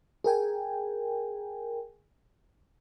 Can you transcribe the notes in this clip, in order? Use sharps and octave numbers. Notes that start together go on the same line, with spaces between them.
G#4 A#4 G5 G#5